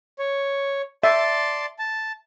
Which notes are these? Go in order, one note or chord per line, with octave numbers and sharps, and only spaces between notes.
C#5
D5 E5 A5 C6
A5